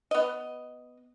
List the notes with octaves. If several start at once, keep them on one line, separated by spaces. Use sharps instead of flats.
B3 D#5